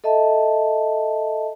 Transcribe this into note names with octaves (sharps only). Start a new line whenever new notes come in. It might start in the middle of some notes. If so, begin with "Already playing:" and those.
A4 D#5 E5 A5